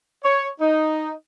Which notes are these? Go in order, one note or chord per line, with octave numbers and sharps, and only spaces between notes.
C#5
D#4